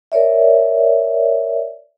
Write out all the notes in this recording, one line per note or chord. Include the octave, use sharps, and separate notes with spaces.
A#4 C#5 D5 E5